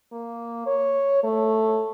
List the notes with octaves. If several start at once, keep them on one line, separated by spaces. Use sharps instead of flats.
A#3
C#5
A3